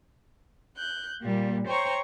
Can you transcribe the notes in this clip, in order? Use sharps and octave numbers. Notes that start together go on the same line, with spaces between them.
F#6 G6
A#2 G3 A#3
C5 C#5 G5 A#5 C#6